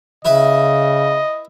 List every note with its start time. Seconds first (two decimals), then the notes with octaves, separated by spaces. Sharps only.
0.25 C#3 E4 B4 D#5 E5